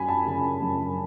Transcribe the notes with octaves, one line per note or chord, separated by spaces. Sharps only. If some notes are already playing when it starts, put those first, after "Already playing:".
Already playing: F#2 F#3 G#5 B5
A5
C#3
F#2